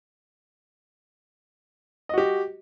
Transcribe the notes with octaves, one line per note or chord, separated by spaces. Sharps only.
F#4 G4 D#5